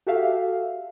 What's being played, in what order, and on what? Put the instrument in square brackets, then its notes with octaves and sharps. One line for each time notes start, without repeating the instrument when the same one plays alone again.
[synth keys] F#4 G4 A4 E5 F5